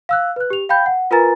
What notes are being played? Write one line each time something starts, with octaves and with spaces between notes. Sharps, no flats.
F5 E6 F#6
B4 F#6
G4 F7
F5 G5 B5 G6
F#5
F4 A#4 B4 G#5 A#5 A6